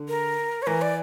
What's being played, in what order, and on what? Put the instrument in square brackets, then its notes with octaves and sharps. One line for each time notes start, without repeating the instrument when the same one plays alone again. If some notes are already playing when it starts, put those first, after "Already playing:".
Already playing: [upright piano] D3
[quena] A#4
C#5
[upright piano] E3 [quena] A#4
[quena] D5